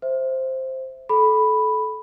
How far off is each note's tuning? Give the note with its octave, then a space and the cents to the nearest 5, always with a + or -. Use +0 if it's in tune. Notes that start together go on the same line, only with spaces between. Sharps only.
C5 +0 E5 +0
A4 -25 B5 +0